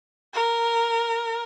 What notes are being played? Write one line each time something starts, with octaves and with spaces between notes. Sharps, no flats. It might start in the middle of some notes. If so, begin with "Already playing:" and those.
A#4